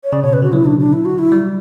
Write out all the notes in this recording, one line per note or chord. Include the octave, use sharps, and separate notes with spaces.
C#5
C#3 D5
B2 C#5
C#3 B4
D3 F#4
F#3 E4
D4
D4
E4
F#4
E4
G3